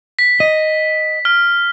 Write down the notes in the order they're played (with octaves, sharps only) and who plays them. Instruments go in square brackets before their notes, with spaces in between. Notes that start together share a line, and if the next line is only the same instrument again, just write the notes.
[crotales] B6
[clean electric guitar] D#5
[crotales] F6